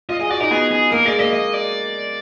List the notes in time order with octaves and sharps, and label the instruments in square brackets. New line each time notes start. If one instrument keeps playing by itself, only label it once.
[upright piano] F4 [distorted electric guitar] D#5
[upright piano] G#4 [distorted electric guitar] D#5
[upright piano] F#4 [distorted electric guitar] D5
[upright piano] D#4 [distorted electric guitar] A#4
[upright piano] B3 [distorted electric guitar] G#4
[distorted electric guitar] G#4
[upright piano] A#3 [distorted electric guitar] A#4
[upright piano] G#3 [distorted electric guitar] D5
[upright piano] A#3 [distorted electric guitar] D#5
[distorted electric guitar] D#5
D5